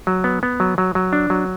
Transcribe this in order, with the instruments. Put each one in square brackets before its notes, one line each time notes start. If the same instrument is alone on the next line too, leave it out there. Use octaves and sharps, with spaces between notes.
[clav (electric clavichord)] F#3
B3
B3
F#3
F#3
F#3
D4
F#3